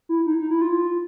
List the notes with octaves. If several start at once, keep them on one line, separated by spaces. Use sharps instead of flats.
E4
D#4
D#4
E4
F4